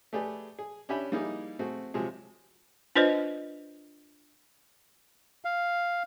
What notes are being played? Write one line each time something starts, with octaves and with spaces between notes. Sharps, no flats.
A3 G4 G#4 B4 D5
G#4
C#4 D4 G4 E5 G#5 B5
G3 A#3 D#4 E4 G#4
A3 C4 F#4 G#4
C3 F3 F#3 G#3 G#4
D4 F4 B4 C5 D5 D#5
F5